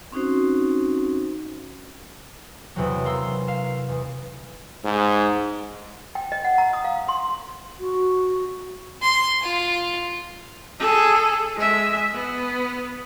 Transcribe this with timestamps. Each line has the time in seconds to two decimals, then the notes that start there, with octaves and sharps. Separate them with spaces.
0.12 C4 C#4 D#4 F#4 C5
2.76 E2 C3 F#3
3.05 A#4 F5 A#5 C6 E6
3.47 F5 E7
3.89 E2
4.84 G#2
6.15 G5
6.32 D#5
6.44 F#5
6.58 A#5
6.73 D#6
6.84 F5
7.08 C6
7.79 F#4
9.02 C6
9.43 F4
10.80 G#4 A4
11.56 G#3 E5
12.13 B3